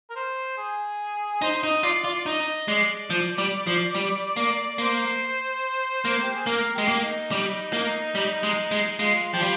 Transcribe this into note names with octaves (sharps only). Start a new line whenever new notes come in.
A#4
C5
G#4
D#4 C5
D#4 D#5
F4 D5
F4 D5
D#4 D#5
G#3 D5
F3
G3
F3
G3
A#3
A#3 C5
A#3
G4
G#4
A#3 A#4
G#3 G4
A#3
D#4
G3
A#3
G3
G#3
G#3
G#3 F4
F3 G4
G3 F4